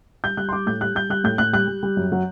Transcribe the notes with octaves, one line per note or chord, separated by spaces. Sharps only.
G3 G6
G3 F#6
C6
G3 D6
A2 G6
G3 F#6
G3 G6
G3 F#6
A2 G6
A2 F#6
G3 F#6
G3
G3
F#2
F#3